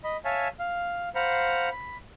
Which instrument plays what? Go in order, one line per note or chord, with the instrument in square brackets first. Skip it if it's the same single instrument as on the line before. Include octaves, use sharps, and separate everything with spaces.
[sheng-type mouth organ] D#5 B5
C#5 E5 F5 G#5 A5
F5
C5 F5 F#5 A#5 B5
B5